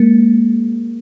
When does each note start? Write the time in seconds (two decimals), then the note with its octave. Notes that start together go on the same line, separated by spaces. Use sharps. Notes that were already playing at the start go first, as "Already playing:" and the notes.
Already playing: G#3 A#3